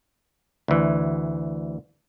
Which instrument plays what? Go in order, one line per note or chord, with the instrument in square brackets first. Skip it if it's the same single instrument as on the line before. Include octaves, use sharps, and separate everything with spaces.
[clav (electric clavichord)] D2 E3